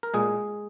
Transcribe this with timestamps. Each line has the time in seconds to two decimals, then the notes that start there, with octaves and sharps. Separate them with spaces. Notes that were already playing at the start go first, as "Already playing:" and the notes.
0.03 A#4
0.14 A#2 G#3 G#4